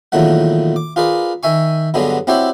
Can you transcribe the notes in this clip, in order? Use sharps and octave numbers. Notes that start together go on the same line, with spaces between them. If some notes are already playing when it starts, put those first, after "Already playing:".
E2 A#2 D#3 F#3 A3 F#5
D6
F4 G#4 A#4 B4 D5
D#3 E5 G#5 C#6
G2 D3 F#3 G#3 B3 D4
C4 E4 F#4 G4 C#5 D5